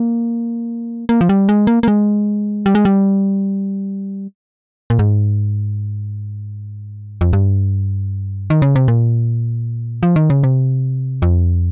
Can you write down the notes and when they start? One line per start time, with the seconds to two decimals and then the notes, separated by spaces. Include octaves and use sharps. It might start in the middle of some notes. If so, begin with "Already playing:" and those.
Already playing: A#3
1.09 A#3
1.21 F3
1.29 G3
1.49 G#3
1.67 A#3
1.83 A#3
1.88 G#3
2.66 G3
2.75 G#3
2.85 G3
4.90 A#2
4.99 G#2
7.21 F2
7.33 G2
8.50 D#3
8.62 C#3
8.76 C3
8.88 A#2
10.03 F3
10.16 D#3
10.30 C#3
10.43 C3
11.22 F2